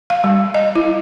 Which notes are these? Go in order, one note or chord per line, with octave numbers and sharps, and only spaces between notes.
F5
G3
D#5
E4